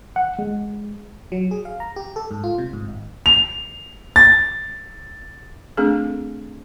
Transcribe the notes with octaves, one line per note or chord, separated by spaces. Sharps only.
F#5
G#3
F#3
G#4
F5
A#5
G4
A4
G#2
F4
C3
G#2
G#1
F7
A6
A3 C4 D4 G#4 A4